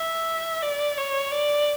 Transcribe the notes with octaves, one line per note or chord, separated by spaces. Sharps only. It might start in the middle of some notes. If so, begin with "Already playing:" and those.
Already playing: E5
D5
C#5
D5